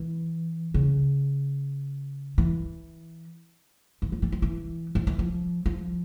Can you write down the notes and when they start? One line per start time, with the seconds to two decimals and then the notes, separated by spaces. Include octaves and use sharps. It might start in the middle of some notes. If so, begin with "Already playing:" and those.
Already playing: E3
0.74 C#3
2.38 E3
4.02 E3
4.12 F3
4.22 E3
4.32 F3
4.42 E3
4.95 F3
5.07 E3
5.19 F3
5.66 F3